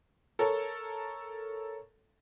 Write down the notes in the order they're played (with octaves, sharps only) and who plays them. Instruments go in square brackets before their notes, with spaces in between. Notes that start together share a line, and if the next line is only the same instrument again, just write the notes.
[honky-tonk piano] A4 A#4 C#5